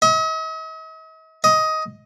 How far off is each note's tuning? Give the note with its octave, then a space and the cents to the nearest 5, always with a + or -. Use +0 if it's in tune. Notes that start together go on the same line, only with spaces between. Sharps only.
D#5 +45
D#5 +15